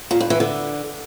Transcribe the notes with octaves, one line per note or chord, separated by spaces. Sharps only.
A#2
G2
E3
D3